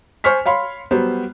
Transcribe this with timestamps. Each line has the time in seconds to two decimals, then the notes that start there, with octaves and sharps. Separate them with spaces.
0.24 C5 G#5 C#6 F6 B6
0.46 C#5 F5 B5 C6
0.91 F#3 G3 B3 C5